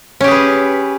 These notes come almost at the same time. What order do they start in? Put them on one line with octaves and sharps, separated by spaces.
C#4 G4 G#4 B4